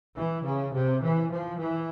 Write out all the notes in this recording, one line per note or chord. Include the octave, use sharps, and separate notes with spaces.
E3
C#3
C3
E3
F3
E3